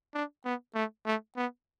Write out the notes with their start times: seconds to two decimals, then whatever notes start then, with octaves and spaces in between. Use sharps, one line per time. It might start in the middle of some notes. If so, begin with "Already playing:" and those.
0.14 D4
0.45 B3
0.75 A3
1.06 A3
1.36 B3